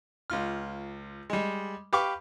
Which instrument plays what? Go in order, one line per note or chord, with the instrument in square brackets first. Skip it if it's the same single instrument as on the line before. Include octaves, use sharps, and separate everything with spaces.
[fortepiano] C#2 F4 F6
G3 G#3
G4 B4 F5 C#6 D6 F6